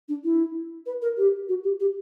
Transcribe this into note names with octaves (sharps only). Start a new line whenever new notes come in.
D4
E4
B4
A#4
G4
F#4
G4
G4